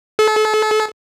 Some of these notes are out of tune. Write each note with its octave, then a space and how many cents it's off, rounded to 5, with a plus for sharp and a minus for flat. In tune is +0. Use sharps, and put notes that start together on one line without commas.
A4 -35